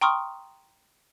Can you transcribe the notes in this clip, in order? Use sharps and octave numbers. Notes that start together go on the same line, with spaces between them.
G5 A#5 C6 C#6 D#6 F6